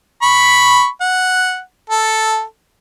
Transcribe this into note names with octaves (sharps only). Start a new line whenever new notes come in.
B5 C#6
F#5
A4